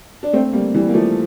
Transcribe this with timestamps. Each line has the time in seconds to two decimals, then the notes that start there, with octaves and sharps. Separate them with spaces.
0.23 D4
0.33 A3 C4
0.53 G3 A#3
0.74 E3 G3
0.89 A#3
0.94 F3 A3